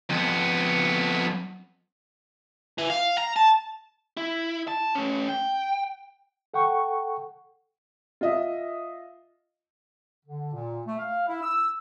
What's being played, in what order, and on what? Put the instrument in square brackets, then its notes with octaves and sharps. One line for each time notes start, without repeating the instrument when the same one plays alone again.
[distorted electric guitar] F2 B3
E3
F5
A#5
A5
[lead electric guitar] E4
A5
A3 C#4
G5
[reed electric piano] A4 F#5 G5 C#6
[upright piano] F4 D#5 E5
[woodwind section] D3
A#2
A3
F5
E4
E6